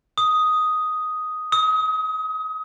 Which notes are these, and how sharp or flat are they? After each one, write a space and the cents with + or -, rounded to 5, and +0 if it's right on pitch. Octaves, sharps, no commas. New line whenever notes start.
D#6 +5
D#6 +30